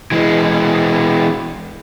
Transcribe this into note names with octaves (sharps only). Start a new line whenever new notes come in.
E3 G#3